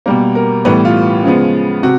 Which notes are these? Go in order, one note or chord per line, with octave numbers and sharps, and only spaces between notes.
B2 G3 A#3
A#4
A2 E3 G3 B3 B4
F4
C#3 F3 G#3 B3
C3 F#4